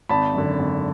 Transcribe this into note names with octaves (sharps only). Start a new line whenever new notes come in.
G#1 A5 B5
F#2 D3
G#1